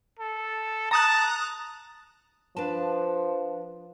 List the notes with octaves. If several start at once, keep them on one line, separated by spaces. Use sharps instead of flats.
A4
A5 A#5 D#6 F#6
F3 D4 B4 A5